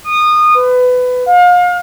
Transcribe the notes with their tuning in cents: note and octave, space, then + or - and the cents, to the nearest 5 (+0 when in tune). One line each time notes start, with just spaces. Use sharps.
D#6 -25
B4 +20
F5 +35